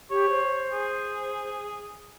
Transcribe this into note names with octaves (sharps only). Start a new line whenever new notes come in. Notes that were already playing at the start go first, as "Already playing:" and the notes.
G4 C#5
C5
G#4